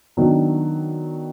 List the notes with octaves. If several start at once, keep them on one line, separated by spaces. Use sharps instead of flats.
D#3 F#3 B3 D4